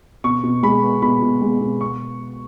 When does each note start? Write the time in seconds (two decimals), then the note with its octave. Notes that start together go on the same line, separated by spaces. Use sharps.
0.24 B2 C#6
0.43 B2
0.63 G#3 B5
0.82 B3
1.02 B2 B5
1.22 B2
1.41 G#3
1.61 B2
1.81 C#6